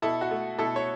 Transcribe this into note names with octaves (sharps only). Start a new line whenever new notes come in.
B2 E4 A4
F#4
A3
B2 E4 A4
C#5